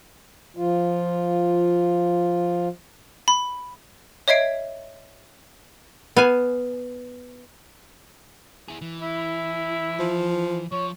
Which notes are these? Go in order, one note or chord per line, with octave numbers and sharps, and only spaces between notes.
F3 F4
B5
C#5 D#5 E5 G#6 C7 D7
B3 F5 G#5
E4 G#4
E3
E4
F3
F3 C#5